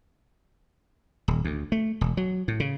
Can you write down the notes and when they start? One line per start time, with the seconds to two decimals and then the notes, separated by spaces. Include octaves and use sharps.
1.28 D#1
1.45 D2
1.72 A3
2.01 E1
2.17 F#3
2.48 A2
2.60 C#3